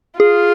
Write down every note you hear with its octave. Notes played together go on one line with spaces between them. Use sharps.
F4 G#4